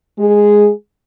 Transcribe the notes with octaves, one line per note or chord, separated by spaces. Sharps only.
G#3 G#4